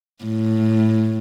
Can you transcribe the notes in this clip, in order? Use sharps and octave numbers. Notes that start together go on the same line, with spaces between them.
A2